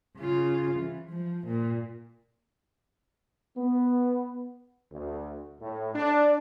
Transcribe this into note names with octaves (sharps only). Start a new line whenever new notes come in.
C#3 F4
E3
F3
A#2
B3
D2
A2
D4